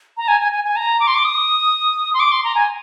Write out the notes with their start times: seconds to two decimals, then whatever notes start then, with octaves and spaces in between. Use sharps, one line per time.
0.17 A#5
0.28 G#5
0.41 G#5
0.53 G#5
0.64 G#5
0.76 A#5
1.00 D6
1.07 C6
1.15 D6
1.25 D#6
2.14 C6
2.20 D6
2.32 C6
2.44 A#5
2.55 G#5